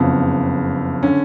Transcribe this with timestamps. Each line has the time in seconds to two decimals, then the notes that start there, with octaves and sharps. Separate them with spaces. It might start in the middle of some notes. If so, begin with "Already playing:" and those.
Already playing: F#1 F2 C#3 B3
1.03 D3 C#4